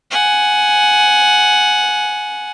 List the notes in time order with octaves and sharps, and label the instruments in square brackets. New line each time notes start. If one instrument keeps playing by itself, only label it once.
[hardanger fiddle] F#5 G#5